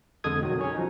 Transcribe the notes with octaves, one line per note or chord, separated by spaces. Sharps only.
F2 D3 G#3 A4 D#6 G#6
B2 D#3 F#3
C#4 G#4 C#5 G#5
F3 F#3 D#4